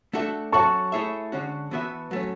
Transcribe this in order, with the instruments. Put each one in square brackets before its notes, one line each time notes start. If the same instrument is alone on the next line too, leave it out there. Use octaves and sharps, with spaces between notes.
[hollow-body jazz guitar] A3 D4 F#4 A4 E5
[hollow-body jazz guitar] F#3 C#4 F#4 A4 E5 [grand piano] A5 C#6
[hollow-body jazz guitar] A3 E4 G#4 C#5 E5
D3 G#3 C#4 F#4
E3 B3 F#4 B4 E5
F#3 A3 C#4